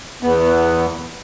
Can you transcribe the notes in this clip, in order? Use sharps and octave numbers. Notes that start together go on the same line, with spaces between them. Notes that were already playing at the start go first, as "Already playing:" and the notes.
E2 B3